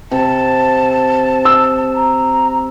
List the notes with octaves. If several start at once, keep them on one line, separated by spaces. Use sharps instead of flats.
C3 A5
E6
A#5